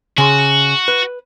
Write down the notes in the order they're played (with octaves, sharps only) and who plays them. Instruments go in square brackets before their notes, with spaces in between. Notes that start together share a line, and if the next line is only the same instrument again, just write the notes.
[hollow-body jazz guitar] C#3 C6 [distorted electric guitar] F#4
[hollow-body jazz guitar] B4